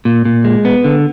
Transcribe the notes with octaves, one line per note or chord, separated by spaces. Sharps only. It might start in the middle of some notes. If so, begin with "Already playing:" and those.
A#2
A#2
G#3
B3
D3